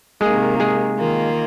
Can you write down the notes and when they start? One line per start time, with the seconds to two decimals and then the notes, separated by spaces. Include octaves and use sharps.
0.21 C3 D#3 G#3 A#3 G#4
0.60 G#3 G#4
0.99 D#3 A#3 F4